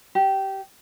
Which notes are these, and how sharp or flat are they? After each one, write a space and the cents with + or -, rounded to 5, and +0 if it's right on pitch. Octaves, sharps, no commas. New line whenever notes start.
G4 -15